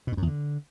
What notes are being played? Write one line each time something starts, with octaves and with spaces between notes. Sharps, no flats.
B2
G#2
F#2
E2
D3